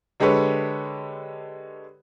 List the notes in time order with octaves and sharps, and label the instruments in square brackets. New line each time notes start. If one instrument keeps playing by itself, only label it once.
[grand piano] D3 G#3 G4 A4 B4 C#5